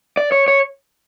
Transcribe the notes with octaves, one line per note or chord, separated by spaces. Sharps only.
D5
C#5
C#5